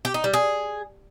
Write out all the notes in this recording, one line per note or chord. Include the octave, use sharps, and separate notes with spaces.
G4
D#4
G3
G#4